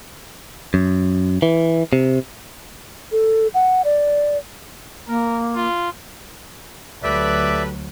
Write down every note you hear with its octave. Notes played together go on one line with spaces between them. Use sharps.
F#2
E3
C3
A4
F#5
D5
A#3 A#4
F4
D2 F#3 G4 A4 B4 D5 E5